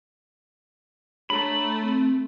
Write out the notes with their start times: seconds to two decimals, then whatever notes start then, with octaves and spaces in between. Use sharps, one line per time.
1.30 A3 D4 C#5 A#5 B5
1.83 C4